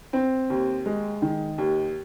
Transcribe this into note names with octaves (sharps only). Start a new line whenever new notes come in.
C4
D#2
G#3
D#3
D#2